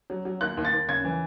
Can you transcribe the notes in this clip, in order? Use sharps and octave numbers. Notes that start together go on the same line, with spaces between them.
F#3
F#3
D#2 F#6
D#2
A6
D#2
C#3 G#6
E3